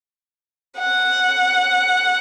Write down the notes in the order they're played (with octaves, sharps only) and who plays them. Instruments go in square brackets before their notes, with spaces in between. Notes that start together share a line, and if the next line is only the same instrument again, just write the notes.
[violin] F#5